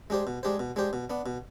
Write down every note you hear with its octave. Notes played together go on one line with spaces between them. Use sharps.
G#3 D4 G4 C5
B2
G#3 D4 G4 C5
B2
G#3 D4 G4 C5
B2
B3 D4
B2